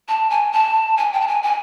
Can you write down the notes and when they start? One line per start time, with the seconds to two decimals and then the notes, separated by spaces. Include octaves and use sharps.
0.08 A5
0.30 G#5
0.52 A5
0.97 G#5
1.12 G5
1.21 A5
1.27 G#5
1.43 G#5